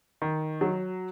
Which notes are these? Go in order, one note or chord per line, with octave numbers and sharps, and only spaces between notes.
D#3
F#3